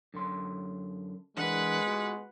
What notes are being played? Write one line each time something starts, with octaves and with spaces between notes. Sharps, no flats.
F#2 D3 C6
E3 G#3 D4 A#4 B4 F#5
B3 F4 F#4